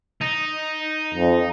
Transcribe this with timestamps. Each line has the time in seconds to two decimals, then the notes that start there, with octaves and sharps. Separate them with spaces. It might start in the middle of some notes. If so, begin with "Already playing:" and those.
0.21 D#4
1.14 F2